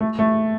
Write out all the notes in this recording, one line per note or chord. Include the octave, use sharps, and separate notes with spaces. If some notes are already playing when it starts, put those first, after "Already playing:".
A3
A3